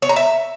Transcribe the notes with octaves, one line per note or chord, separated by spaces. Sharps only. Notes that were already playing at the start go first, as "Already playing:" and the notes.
C#5
A#5
E5